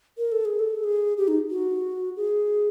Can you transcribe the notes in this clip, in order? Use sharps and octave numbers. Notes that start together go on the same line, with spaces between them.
A#4
A4
G#4
A4
G#4
G4
D#4
F#4
G#4